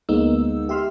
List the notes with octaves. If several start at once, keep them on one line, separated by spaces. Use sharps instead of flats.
D2 G#3 A#3 B3 D#4 E6
G4 E5 C6 E6 F6